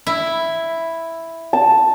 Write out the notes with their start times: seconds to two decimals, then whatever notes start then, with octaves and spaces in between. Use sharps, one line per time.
0.07 E4
1.53 A5